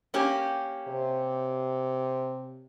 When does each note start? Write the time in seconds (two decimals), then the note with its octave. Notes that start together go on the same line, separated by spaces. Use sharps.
0.14 A#3 C#4 G4
0.88 C3